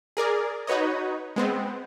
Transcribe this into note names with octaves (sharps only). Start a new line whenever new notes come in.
G#4 A#4 D5
D#4 F#4 B4 C#5 D#5
G#3 B3 C4